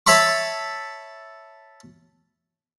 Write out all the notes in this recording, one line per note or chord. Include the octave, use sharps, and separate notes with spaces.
C#5 E5 A5 B5 C#6